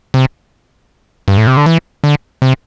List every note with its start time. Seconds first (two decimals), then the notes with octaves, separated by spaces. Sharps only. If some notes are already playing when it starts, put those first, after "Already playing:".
0.14 C3
1.28 G2
1.38 A2
1.47 C3
1.57 D3
1.66 E3
2.04 D3
2.42 C3